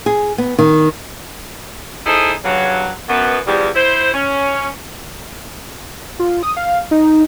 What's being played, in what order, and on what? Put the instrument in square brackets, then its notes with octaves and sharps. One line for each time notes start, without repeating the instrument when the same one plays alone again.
[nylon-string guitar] G#4
B3
D#3
[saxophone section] D#4 E4 G#4 A4 C5
G2 C#3 F#3
F#2 B3
E2 F3 G3
E4 C5
C#4
[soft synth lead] F4
D#6
F5
D#4